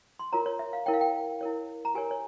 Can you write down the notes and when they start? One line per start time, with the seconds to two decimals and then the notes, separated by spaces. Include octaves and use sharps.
0.19 C6
0.32 F4 A#4 C#5 A#5
0.46 C#5
0.59 E5
0.73 F5
0.86 E4 A#4 C#5 G5
0.93 F5
1.01 G5
1.41 E4 A#4 C#5
1.85 A#5
1.95 G4 A#4 C#5 G#5
2.11 C#5